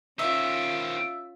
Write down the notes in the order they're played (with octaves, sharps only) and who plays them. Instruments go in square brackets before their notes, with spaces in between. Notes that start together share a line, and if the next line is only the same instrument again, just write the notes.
[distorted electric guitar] D#3 C4 [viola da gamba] C#4 F4 [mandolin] E5